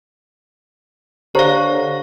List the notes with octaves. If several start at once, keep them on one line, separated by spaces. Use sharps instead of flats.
D3 G4 C5 C#5 F5 A#5